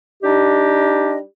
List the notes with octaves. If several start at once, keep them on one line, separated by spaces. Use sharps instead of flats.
G3 D4 D#4 G4 D#5